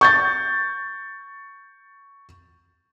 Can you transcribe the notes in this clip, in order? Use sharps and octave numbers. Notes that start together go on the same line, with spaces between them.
C#6 G6 A6